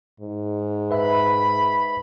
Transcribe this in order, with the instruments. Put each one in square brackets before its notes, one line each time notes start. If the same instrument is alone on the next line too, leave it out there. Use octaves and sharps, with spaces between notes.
[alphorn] G#2
[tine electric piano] B4 E5 [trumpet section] B5